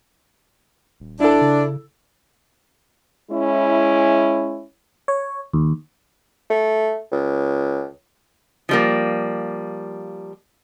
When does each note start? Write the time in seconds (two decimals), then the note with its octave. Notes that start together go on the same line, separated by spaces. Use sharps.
1.00 D#1
1.20 D4 E4 A4
1.41 C#3
3.31 G#3 C#4 E4
5.08 C#5
5.53 D#2
6.50 A3
7.12 C#2
8.69 F3 G3 A#3